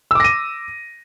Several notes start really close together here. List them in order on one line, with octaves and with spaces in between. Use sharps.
E6 D6 A#6 D#7